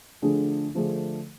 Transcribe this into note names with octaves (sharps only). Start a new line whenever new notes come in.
D3 F3 A3 D4 G#4
D3 F3 A3 D4 G#4